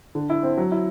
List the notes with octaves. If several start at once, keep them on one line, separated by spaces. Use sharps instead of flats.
D3
E4
C4
F#3
E4